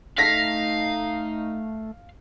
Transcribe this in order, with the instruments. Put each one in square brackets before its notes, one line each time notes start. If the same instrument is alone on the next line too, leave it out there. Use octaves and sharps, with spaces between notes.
[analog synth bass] A3 [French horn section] D#4 [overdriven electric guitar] F5 [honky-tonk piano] A#6 B6